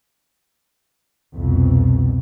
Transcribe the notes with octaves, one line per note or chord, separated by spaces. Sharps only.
C2 F2 B2